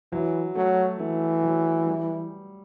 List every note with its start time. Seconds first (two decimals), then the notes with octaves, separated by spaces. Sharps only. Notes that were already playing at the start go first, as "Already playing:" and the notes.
0.12 E3 F#3
0.55 F#3 A3
0.99 E3 A3
1.43 F#3
1.87 G3